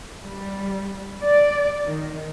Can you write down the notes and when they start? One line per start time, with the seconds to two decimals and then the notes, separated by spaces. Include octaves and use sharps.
0.22 G3
1.22 D5
1.86 D#3